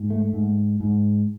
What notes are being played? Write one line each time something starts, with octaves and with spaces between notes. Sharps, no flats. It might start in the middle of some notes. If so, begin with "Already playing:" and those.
Already playing: G#2
A3
G#2
G#2